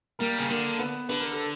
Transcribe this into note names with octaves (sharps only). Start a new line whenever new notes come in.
G3 A#3 A#4
C#3
D3 A#3 A#4
B3 B4
D3 B4
A#4
A4